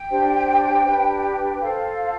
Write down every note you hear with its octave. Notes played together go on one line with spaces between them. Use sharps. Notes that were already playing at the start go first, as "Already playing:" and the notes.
Already playing: G5
D4 G4 C5
D4 G4 B4
F4 A4 C5 F5